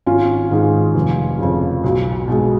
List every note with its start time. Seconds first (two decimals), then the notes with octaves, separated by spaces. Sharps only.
0.06 G#1 C#4 F4
0.51 G#2 D#3 G#3
0.95 F1
1.39 F2 C#3
1.84 B1
2.28 B2 G#3